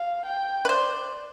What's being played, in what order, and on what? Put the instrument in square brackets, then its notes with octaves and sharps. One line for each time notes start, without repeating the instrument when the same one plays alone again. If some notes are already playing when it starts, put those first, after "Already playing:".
Already playing: [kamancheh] F5
G5
[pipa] B4
[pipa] C5 [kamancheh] D5